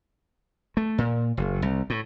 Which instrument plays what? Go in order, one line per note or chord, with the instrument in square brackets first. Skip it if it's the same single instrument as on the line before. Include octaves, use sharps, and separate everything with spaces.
[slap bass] A3
A#2
F#1
C2
A2